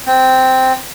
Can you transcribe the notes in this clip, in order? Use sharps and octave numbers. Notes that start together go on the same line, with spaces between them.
C4